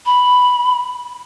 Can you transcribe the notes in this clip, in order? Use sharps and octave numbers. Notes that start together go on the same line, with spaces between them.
B5